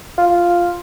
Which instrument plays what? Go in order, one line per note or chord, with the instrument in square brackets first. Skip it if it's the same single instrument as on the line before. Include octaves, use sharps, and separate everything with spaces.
[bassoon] F4